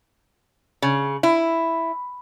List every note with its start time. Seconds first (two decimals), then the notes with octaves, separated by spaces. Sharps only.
0.82 C#3
1.23 E4